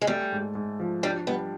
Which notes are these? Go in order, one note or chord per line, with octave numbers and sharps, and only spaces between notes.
G#3
G3 A3
G#2
G#2
F3
G3 D4
G3 B3